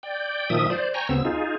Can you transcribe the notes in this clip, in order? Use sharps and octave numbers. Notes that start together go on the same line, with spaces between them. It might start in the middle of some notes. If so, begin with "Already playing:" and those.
D5 G5
A#2 D#3 F3 E5 D#6
C5 D5
G5 G#5 A#5 C#6
D2 C#3 B3 C4 E6
D#4 F4 G#4